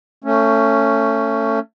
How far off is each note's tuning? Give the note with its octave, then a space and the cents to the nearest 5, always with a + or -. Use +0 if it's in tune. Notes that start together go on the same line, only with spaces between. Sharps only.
A3 +25 C#4 +0